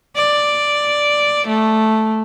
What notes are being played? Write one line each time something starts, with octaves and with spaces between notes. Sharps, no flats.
D5
A3